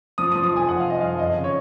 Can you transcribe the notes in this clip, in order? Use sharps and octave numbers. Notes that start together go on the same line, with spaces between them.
F3 D#6
D#6
F3
D#6
F1 G#5
F1 F#5
F5
F1 D#5
F2 F5
F2 D#5
C#3
C#5